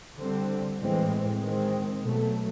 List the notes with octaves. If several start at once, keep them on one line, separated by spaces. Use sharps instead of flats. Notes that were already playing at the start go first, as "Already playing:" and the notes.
D3 G3 C4
A2 E3 G#3 C4
D#3 G#3 C4
B2 F#3 A3